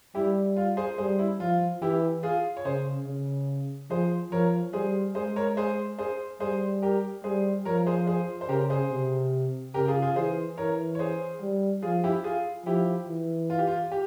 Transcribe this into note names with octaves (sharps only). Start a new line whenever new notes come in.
G3 E4 G4
F4
G#4 C5
G3 G#4 C5
E4
F3 F4
E3 E4 G4
F4 G#4
C#5
C#3 G#4 C5
C#3
F3 G#4 C5
F3 A#4 C#5
G3 G#4 C5
G#3 G#4 C5
A#4 C#5
G#4 C5
G#4 C5
G3 G#4 C5
G4 A#4
G3 G#4 C5
F3 A#4 C#5
G#4 C5
G#4 C5
C5
C#3 G4 A#4
G#4 C5
C3
C#3 G4 A#4
F4 G#4
F4 G#4
E3 G#4 C5
E3 A#4 C#5
C#5
G#4 C5
G3
F3 F4 G#4
E4 G4
F4 G#4
F3 E4 G4
E3
F4
G4
F4
G4